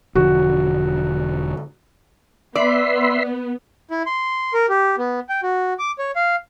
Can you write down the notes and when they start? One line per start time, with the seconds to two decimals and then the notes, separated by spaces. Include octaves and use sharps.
0.15 E1 D3 F3 F#4
2.55 B3 D5 E5 B5 C6
3.91 E4
4.06 C6
4.54 A#4
4.69 G4
4.98 B3
5.29 G5
5.43 F#4
5.79 D6
5.99 C#5
6.16 F5